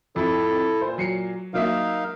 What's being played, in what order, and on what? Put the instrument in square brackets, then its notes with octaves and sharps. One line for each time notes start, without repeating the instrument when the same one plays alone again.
[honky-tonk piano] F2 [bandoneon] E4 A4
[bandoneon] A#2 [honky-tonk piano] C5
[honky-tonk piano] F#3 C7 C#7
[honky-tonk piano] F#3 A#3 E5 [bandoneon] D#4 F5